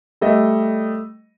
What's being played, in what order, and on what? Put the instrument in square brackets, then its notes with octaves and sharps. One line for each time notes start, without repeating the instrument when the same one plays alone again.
[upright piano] G3 A3 D#5